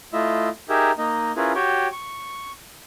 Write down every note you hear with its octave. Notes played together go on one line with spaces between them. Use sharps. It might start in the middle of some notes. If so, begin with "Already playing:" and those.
A3 E4 F4 D#5 E5
D#4 G4 G#4 A#4 E5
A#3 D#4 D#5
C#4 E4 F4 G#4 A#4 B4
F#4 G4 C#5 G5
C#6